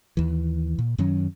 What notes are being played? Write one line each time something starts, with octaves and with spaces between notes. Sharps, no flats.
D#2 E3
A#2
F#2 D#3 F#3 C#4